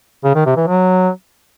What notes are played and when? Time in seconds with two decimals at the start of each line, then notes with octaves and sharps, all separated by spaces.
0.24 C#3
0.35 D#3
0.46 C3
0.57 E3
0.67 F#3